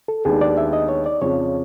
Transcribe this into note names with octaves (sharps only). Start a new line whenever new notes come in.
A4
D#2 D#3 G#3 B3 D4 G#4
D5
E5
D#5
C#5
D5
F2 C#3 F3 C#5